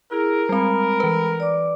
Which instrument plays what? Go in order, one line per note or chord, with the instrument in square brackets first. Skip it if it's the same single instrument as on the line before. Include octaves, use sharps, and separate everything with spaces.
[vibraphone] E4 G#4 [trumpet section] A#4
[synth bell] G3 C4 [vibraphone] G#3 B5
[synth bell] E3 B4
[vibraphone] D5 D6